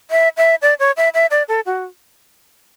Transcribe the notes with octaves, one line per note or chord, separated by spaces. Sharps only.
E5
E5
D5
C#5
E5
E5
D5
A4
F#4